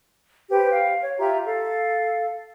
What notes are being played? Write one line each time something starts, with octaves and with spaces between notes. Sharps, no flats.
G4 B4 C5
F5 G5
C#5
F4 G4 E5 A#5
A4 F5